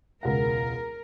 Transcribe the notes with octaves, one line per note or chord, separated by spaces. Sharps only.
E1 C#2 A#4 F#5